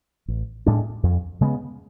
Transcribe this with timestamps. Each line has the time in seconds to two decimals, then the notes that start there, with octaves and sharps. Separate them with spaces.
0.28 A1
0.66 A2 G#3 D4
1.03 F2
1.41 C#3 G#3 B3